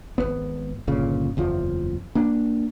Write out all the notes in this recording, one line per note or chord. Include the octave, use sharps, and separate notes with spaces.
G#1 D#2 B3
G1 A#2 C#3
F#1 E2 F3
A#3 D4